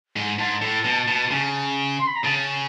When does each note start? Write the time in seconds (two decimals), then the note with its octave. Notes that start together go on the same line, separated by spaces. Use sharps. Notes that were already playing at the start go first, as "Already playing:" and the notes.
0.16 G#2
0.39 G#2 A5
0.62 A2
0.85 B2
1.08 B2
1.31 C#3
1.99 C6
2.07 B5
2.16 A#5
2.24 C#3 A5